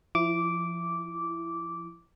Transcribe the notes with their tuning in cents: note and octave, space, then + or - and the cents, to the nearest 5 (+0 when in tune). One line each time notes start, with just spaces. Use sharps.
F3 -20 E4 +15 D6 -10